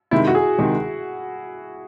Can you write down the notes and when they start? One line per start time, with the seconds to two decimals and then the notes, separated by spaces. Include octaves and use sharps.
0.11 C3 D#3 G#3 E4
0.27 F#4
0.35 G#4
0.58 C3 D#3 G#3